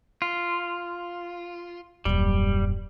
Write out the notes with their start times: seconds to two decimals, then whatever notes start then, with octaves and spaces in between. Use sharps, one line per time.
0.22 F4
2.05 D#1 F#2 G3